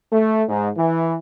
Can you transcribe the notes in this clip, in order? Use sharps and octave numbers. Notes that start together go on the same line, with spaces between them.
A3
G#2
E3